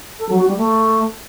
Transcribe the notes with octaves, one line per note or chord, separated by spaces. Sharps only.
A4
F#3
F#4
G3
A3